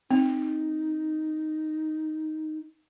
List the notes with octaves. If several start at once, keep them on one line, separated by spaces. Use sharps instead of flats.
C4 D#4